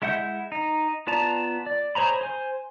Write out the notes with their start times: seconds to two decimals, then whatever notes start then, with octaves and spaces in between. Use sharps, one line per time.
0.02 G#3 E4 E5 F#5 G6
0.52 D#4
1.07 B3 F4 D5 A5 A#5
1.66 D5
1.95 G#4 C5 C#5 A#5 B5
2.21 C5 G#5